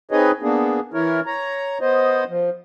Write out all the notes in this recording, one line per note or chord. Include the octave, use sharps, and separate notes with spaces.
C4 D#4 G#4 B4 C#5 D#5
A#3 B3 D4 G#4
E3 E4 A#4 C#5
C#5 A#5
B3 C5 D#5
F3